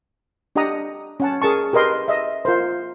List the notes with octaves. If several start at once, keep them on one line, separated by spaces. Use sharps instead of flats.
D4 G4 D#5 F#5 A#5 D#6
C#4 F#5 A5
G#4 A#4 A5 C#6
G4 A#4 B4 D#5 C6
D#5 E5
F4 A#4 C5